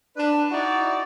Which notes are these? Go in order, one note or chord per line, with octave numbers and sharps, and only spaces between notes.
D4 B4
D#4 E4 F#4 D5